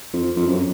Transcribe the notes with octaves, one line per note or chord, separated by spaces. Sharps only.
F2
F2
F#2